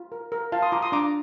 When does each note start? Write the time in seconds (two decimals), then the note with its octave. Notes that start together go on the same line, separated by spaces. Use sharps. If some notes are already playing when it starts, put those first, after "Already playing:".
Already playing: F4
0.12 A#4
0.32 A#4
0.52 F4 F5 A5
0.62 C6 D#6
0.72 F4 A#5 D6
0.82 C6 D#6
0.92 D4 A#5 D6